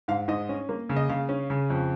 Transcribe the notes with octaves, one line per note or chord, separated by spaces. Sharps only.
G#2 F5
G#2 D#5
C#4
A#3
C#3
D#5
C#3 F5
C#4
C#3
F2